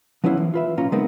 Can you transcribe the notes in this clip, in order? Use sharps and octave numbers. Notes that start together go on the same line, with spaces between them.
F3 B3 C#4 E4 C5 F#5
E3
F4 B4 E5
B1 A#2 C#4 F4 A#5
C#3 G#3 B3 C4 D#4 A#4